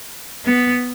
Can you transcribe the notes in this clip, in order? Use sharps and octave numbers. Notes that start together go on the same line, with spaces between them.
B3